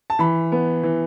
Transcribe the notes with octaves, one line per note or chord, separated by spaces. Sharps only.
A5
E3 B5
B3
E3